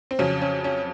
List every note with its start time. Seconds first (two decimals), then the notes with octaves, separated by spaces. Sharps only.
0.11 C4
0.19 F2 C#3 F#3 C#4
0.42 C#4
0.64 C#4